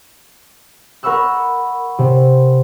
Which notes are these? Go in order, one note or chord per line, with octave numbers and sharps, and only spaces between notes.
A#4 F#5 B5 C#6 E6 F#6
C3